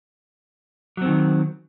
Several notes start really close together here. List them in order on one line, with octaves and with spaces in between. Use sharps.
F#3 C4 D#3